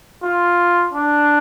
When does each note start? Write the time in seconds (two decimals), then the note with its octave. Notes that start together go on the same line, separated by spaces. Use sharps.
0.24 F4
0.93 D4